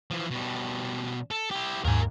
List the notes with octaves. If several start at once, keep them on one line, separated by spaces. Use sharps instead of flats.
E3 F3
B2 G3
A4
E4 G4
D#2 G#2 A#4 G#5